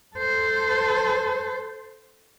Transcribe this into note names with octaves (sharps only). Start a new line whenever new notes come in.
A4 C5